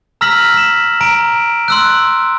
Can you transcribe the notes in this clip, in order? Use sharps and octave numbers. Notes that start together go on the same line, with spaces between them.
A#5 E6 F6 A#6 B6 F#7
B6 E7
A#5 D7
C6 E6 F#6